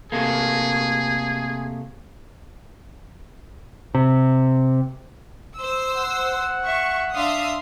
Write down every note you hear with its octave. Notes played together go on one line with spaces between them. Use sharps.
C3 A3 A#3 G#4
C3
C5 E6
F#5
E5 C#6
D4 E5 F5 C6 D#6